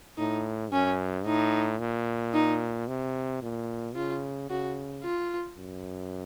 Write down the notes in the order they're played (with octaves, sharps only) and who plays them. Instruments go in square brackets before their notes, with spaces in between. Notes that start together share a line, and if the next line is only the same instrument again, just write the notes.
[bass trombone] A2 [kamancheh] D#4
[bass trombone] F#2 [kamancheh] C#4
[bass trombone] A2 [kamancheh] D#4
[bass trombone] A#2
[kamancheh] D#4
[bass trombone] C3
A#2
[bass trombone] C#3 [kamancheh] F4
[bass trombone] C#3 [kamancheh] F#4
[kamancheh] F4
[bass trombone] F#2